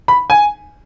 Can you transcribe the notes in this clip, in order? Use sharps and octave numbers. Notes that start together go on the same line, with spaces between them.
B5
G#5